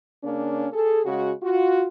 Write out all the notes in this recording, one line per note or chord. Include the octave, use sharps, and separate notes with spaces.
C#3 A#3 C#4 D4
G#4 A4
C#3 G#3 F#4
F4 F#4